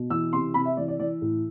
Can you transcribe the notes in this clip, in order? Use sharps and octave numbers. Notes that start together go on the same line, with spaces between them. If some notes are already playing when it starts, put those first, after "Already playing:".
Already playing: B2
E3 E6
C3 C6
C3 B5
E5
E3 D5
D5
E3 D5
A2